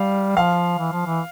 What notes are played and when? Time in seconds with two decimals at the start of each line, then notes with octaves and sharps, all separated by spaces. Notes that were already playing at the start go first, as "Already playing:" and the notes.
Already playing: G3 F5
0.36 F3 F5
0.79 E3
0.93 F3
1.06 E3